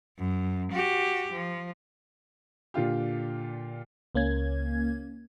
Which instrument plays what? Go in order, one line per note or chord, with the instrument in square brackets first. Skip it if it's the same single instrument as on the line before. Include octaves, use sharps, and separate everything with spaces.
[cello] F#2
F#4 G4
F3
[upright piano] A#2 D3 F4 G4
[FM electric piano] C#2 A#3 C#4 G#6